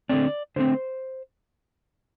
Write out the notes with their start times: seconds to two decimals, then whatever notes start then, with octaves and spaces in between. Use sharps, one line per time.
0.09 D3 A3 C4 D5
0.56 D3 A3 C4 C5